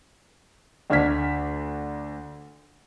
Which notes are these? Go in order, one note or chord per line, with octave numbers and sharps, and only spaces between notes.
D2 D4 F6 G#6 B6